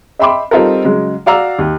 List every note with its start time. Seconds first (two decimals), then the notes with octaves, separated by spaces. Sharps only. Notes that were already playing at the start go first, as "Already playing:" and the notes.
0.19 D#5 E5 G5 B5 C6 D6
0.51 G3 C4 D#4 F4 A4 A#4
0.84 C#3 F#3 G#3
1.26 F#4 D5 F5 A#5 E6
1.59 D#2